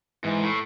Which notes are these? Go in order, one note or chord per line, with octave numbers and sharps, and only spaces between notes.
G#2 E3
A2